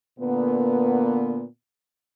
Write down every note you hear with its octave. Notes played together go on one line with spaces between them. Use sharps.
A#2 D3 A#3 B3